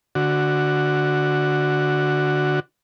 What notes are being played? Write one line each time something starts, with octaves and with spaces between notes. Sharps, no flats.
D3 F#4